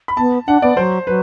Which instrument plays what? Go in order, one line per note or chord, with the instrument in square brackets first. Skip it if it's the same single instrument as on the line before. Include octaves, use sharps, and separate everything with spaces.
[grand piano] B5
[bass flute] B3 [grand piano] A5
[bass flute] D4 [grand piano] F#5
[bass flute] B3 [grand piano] D5
[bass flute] F#3 [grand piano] C5
[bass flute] F#3 [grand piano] B4